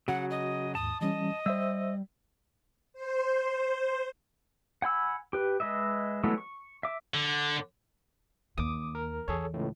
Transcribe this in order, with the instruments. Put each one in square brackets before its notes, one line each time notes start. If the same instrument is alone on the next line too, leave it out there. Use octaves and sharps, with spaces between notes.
[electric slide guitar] C#3 F#3 [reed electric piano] F#4 [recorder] F#5
[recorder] D#5
[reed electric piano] D#2 G#2 [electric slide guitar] A5 [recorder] D#6
[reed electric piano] E3 G3 C#4 [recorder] D#5
[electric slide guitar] G3 [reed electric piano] C5 E5 E6
[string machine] C5
[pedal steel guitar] F#5 G#5 B5 E6
G4 B4
G#3 B4 D#5 E5
E3 F#3 G#3 A3 B3
C#6
E5 D6
[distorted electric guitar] D3
[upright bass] D#2 [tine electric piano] D6 D#6
[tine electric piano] A#4
[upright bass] E2 [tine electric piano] G#4 A4 C#5
[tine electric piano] C#2 A2